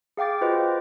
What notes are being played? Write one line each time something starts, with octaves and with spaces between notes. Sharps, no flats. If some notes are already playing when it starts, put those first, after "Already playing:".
G#4 F5 G5 D6 A6
F4 F#4 B4 C5 D#5